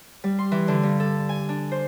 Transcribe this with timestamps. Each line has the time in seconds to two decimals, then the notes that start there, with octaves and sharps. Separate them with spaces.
0.24 G3
0.39 C6
0.52 E3
0.68 D3
0.83 G2
1.00 A4
1.29 G#5
1.49 D4
1.72 C5